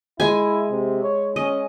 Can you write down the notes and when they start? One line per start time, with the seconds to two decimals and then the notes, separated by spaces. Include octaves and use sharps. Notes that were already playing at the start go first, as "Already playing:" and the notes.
0.20 G#3 E4 G#5
0.71 C3
1.03 C#5
1.36 C#4 D#5